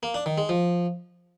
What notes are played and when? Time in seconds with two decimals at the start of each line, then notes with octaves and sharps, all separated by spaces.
0.03 A#3
0.14 D4
0.26 D#3
0.38 G#3
0.49 F3